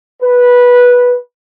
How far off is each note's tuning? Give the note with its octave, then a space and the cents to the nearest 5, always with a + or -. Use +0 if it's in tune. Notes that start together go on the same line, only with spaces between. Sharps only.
B4 -10